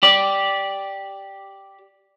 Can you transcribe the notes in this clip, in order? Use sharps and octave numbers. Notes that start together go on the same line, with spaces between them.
G4 D5